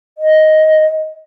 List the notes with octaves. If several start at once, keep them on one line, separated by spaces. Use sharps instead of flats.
D#5